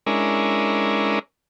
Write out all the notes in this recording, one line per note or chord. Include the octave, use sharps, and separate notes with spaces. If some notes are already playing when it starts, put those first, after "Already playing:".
G#3 C#4 D4 E4 A#4